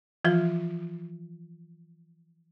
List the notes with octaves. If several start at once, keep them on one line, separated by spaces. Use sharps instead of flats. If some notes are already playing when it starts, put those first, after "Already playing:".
E3 F3 F4